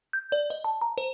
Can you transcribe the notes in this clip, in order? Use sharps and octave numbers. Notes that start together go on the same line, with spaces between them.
G6
D5
D#5
A5
A#5
C5